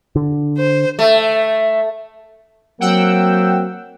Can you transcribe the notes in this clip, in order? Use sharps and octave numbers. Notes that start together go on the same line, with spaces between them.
D3
C5
A3
F#3 A#3 C4 F#4 F#5 G5 E6